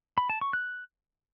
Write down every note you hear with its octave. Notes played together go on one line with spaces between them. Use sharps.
B5
A5
C#6
F#6